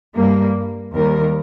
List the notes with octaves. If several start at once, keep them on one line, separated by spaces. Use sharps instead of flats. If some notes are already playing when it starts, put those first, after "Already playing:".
G2 G3 A#3
D#2 D#3 G3 A#4